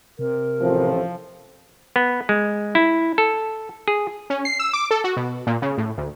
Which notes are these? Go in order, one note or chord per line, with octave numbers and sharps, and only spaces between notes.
C3 A#4
A1 F3 A3 C4
B3
G#3
E4
A4
G#4
C#4
C7
E6
D6
A4
F#4
B2
A#2
C#3
A2
D2